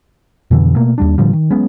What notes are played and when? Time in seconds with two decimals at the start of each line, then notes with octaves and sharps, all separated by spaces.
0.51 F2 B2 D3 E3
0.76 B2 A3 A#3
0.98 D#2 G3 D4
1.18 A2 D3 F3 G3
1.33 D#3
1.50 F#3 G#3 B3 C#4